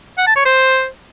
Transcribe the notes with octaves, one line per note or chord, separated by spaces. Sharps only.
F#5
A5
C#5
C5